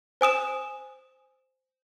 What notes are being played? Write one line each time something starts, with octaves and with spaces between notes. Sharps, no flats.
C5 G#5 D#6 E7